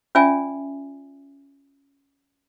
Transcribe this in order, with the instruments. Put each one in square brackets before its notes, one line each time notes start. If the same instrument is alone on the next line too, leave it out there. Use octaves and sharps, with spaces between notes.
[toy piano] C#4 F4 D5 E5 G#5